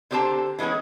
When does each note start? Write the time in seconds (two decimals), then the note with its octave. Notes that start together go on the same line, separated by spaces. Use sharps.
0.11 D3 C4 G4 C5 A5 A#5
0.59 E3 G#3 B3 C#4 G#4